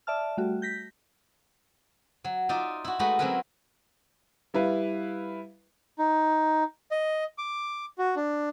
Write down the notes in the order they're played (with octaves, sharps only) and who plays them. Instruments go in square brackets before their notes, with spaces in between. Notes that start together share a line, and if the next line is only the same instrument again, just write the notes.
[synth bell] D5 E5 A5 F6
G3 A3 F#4
G6 A#6 B6
[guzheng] F#3
D#4 F4 D5 E5
E4 F#4
G#3 A3 D#4 F#4 B4 B5
F#3 C4 C#4 E4 A#4 B4
[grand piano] G3 E4 B4 F5
[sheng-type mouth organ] D#4
D#5
D6
F#4
D4